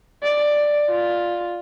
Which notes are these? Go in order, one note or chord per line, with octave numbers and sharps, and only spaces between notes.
D5
F4